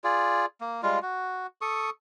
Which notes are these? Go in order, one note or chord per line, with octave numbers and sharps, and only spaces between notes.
F4 G#4 D5
A#3
G3 G#3 F4 F5
F#4
A4 C#6 D#6